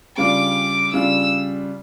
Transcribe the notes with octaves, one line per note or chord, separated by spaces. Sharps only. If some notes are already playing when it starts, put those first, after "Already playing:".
C#3 G3 D4 F4 D6
C#3 G3 D4 F4 E6